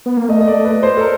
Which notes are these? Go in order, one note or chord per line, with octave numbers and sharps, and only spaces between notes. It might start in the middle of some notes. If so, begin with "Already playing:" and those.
B3
A#3
A3 D#5
D#5
D5
B4
C5
A4
A#4